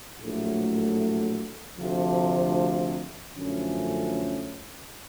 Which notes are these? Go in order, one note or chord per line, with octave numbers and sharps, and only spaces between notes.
A#1 A2 F#3 A3
D2 C3 F3
F#2 D3 F3 A3 C#4